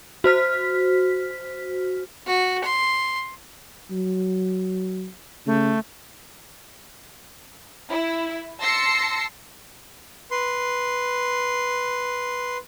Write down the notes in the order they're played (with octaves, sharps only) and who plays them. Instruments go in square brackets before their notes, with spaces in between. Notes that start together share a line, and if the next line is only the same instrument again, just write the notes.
[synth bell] F#4 C5 F6 B6
[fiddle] F#4
C6
[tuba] F#3
[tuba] C#3 [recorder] A3
[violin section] E4
A5 C6 E6 A#6 C7 C#7
[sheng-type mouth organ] B4 C6